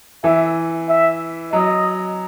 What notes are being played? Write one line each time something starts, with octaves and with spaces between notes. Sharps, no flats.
E3 E5
E5
F#3 D#5